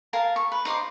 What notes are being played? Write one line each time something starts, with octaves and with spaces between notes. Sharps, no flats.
A#4 F5 G#5 A5
C#6
B4
D#4 C5 C6 D6